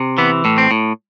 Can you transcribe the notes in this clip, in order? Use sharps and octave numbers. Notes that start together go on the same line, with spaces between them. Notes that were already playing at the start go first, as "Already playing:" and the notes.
Already playing: C3
E3 B3
A2
C4
A2